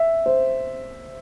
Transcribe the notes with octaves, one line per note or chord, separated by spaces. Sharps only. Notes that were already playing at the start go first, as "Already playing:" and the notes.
Already playing: E5
C5